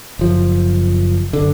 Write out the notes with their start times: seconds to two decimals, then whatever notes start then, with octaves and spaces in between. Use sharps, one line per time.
0.19 F#1 F3
1.33 F#1 D3